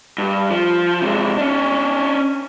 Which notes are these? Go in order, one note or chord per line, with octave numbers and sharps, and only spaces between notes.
G2
F3
C3 G#3
C#4 D4